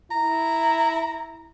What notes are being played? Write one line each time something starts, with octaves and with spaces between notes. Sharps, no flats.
E4 A#5